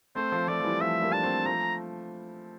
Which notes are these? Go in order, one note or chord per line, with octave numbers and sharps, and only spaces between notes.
A3 C4 C5
F3 A3
F3 A3 D5
F3
E3 G3
F3 A3 E5
G3 A#3
D4 A5
A3 C4
F3 A3 A#5